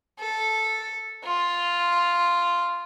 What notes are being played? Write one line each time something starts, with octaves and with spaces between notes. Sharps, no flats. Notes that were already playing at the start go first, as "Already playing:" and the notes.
A4
F4